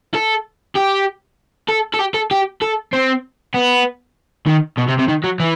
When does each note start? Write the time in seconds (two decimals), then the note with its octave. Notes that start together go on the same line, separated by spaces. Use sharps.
0.14 A4
0.75 G4
1.69 A4
1.94 A4
1.99 G4
2.14 A4
2.31 G4
2.62 A4
2.93 C4
3.54 B3
4.46 D#3
4.78 B2
4.88 C3
4.99 C3
5.08 D#3
5.24 F#3
5.40 E3